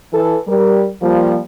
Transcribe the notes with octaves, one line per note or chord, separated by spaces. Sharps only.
E3 A4
G3 A#4
F3 G3 A#3